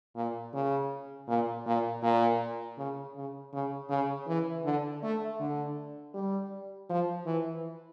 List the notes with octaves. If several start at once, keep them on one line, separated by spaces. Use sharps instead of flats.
A#2
C#3
A#2
A#2
A#2
C#3
C#3
C#3
C#3
E3
D3
A3
D3
G3
F3
E3